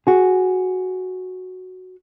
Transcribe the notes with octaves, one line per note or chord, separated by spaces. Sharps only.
F#4 G#4